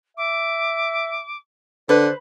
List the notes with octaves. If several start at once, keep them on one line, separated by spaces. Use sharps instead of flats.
E5 D6
D3 B4 C5 F#6